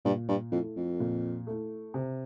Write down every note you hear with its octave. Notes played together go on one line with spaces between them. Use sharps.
G2 A#2
G2
F2 A3 E4
F2
A#2
A3 E4
C3